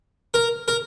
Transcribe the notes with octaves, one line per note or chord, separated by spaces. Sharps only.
A#4
A#4